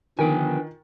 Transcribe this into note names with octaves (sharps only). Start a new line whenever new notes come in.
D3 D#3 F3 B3 F4 G5 G#5